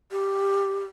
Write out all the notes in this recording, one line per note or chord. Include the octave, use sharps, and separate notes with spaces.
G4